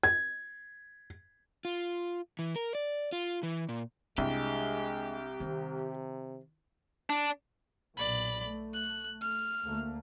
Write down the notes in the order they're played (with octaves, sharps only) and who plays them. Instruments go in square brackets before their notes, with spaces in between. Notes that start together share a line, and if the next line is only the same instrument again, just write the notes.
[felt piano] G#6
[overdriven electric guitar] F4
E3
A#4
D5
F4
E3
A#2
[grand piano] C2 [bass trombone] G#3 [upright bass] D4 [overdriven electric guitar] G4
[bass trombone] C3 [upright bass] D#3
[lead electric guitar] D4
[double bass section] B1 A#2 [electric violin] D5 B5
[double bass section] A3
[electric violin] F#6
F6
[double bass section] D2 A3 A#3